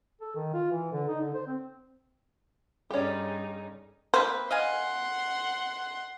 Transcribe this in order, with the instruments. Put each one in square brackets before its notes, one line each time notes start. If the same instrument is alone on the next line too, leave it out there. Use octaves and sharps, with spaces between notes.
[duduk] A4
D#3
F4
E3
D3
D#4
D3
C5
C4
[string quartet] G2 C#3 D#4 [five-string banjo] C#4 G4 [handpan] A4 D5
[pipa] A#3 C4 B4 [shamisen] C5
[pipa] D#5 F5 G#5 [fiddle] F#5 C6